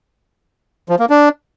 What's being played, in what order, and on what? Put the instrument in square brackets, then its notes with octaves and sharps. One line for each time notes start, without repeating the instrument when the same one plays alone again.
[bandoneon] F3
A#3
D4